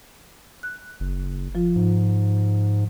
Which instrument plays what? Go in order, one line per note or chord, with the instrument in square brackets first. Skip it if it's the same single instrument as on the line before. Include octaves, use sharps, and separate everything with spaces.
[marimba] F#6
[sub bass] F#1
[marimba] F3 F4
[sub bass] G#2